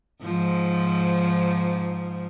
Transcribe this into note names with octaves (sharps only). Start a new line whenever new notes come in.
G#2 F3